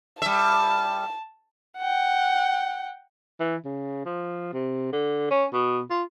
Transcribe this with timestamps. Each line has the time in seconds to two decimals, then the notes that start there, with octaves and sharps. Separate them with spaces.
0.22 G3 E5 A5
1.78 F#5 G5
3.40 E3
3.65 C#3
4.05 F3
4.53 C3
4.92 D3
5.31 C#4
5.53 B2
5.90 F4